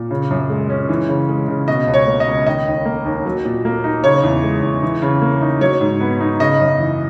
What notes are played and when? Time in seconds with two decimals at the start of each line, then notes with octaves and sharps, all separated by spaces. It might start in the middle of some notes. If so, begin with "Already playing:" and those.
Already playing: A#2
0.11 C#3
0.30 F#2
0.50 G#3
0.69 C#4
0.89 E3
1.09 C#3
1.29 G#3
1.48 C#3
1.68 B2 D#5
1.87 C#2
1.94 C#5
2.07 A#3
2.20 D#5
2.27 C#2
2.47 D#3 D#5
2.67 D#2
2.85 A#3
3.05 D#2
3.26 F#3
3.45 A#2
3.65 A#3
3.84 D#4
4.04 C#3 C#5
4.24 E2
4.43 G#3
4.63 E2
4.83 E3
5.02 C#3
5.22 A#3
5.41 D#4
5.61 F#3 C#5
5.81 G#2
6.00 B3
6.20 D#4
6.40 C#3 D#5
6.59 F#2
6.79 E3